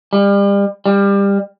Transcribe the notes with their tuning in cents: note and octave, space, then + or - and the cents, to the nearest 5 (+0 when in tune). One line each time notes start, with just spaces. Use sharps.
G3 +35
G3 +25